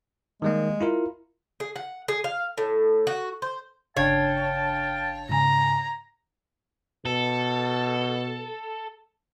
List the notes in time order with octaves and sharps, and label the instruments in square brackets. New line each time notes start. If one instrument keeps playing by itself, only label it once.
[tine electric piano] D#3 G3 A#3 [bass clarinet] G#3
[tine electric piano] E4 F4 A#4
[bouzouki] G#4
F#5
G#4
F5
A2
F#4
C5
[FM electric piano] G1 C#3 D4 [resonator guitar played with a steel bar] C#5 [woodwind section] F5 G5 A5
[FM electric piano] G#2 C#3 G#5 [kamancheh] A#5
[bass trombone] B2 [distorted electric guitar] A4